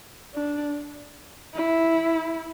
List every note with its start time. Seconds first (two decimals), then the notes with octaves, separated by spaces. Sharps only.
0.34 D4
1.54 E4